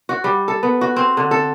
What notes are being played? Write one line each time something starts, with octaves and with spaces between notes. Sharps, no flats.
F#4
G3
A4
B3
F#4
C4
D3
A4